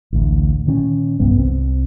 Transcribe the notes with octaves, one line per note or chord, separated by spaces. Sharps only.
A1 D2
A#2 D#3 C4 C#4
C2 G2 G3 B3
C2 G3 C4